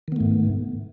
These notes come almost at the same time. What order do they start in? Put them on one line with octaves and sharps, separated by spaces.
D#3 B3 A3 G#2